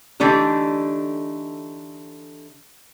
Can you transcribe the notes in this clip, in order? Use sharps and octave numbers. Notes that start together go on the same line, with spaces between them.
D3 E3 A3 D4 D#4 G4